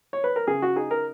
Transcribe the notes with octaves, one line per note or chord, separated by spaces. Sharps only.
C#5
B4
A#4
C#3 G#4
F#4
D#4 G#4
A#4